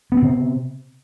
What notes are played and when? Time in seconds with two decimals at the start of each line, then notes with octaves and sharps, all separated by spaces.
0.12 B3
0.17 C4
0.22 C3